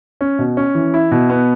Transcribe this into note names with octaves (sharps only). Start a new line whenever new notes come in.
C#4
B2
C#4
E3
E4
B2
B3